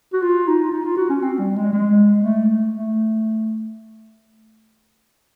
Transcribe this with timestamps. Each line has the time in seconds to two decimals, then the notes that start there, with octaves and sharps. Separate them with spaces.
0.13 F#4
0.22 F4
0.47 D#4
0.72 D#4
0.84 F4
0.97 F#4
1.09 C#4
1.22 C4
1.39 G3
1.56 G#3
1.73 G#3
2.23 A3
2.74 A3